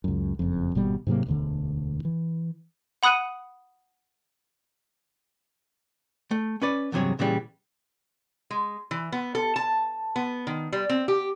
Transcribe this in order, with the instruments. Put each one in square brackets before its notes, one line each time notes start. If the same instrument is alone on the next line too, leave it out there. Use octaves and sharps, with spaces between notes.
[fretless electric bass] C#2 F#2
F#1 F2
G#1 B2 G3 B3
G#2 C3 F#3 A#3
E1 D2 D3
E3
[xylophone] F#5 B5 D#6 F#6 C#7 D#7
[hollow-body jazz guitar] A3
C#4 B4 D5
E2 G2 C3 F#3 G#4 C#5
A#2 C#3 E3 G3
[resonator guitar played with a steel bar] G#3
E3
B3
A4
A5
B3
D#3
G3
C4
G4